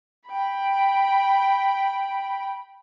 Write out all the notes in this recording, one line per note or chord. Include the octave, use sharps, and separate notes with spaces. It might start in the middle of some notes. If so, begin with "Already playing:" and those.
G5 B5